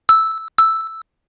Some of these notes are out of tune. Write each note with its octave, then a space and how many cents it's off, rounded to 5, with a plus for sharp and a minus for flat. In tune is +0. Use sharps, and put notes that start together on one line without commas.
E6 -5
E6 +0